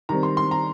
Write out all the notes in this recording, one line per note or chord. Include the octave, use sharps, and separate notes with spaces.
D#3 G3 C4 A#5
C6
C6
A#5